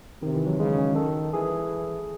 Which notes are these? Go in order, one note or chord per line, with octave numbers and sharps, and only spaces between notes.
C3 D#3
E3
F#3
C#3 G#3
C#4
D#3 A4
E3 G#4